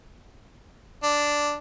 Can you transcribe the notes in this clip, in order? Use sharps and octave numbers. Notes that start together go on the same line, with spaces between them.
D4